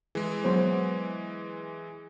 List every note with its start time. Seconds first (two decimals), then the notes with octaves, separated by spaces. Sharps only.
0.15 E3 G#3 G#4
0.44 F#3 B3 C5